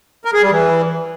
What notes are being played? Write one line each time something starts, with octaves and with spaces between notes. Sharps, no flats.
A#4
G#4
G3
E3